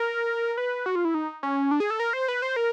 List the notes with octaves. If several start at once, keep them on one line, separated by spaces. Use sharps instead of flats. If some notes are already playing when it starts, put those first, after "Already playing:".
Already playing: A#4
B4
F#4
F4
E4
D#4
C#4
D4
G#4
A4
A#4
C5
B4
C5
A#4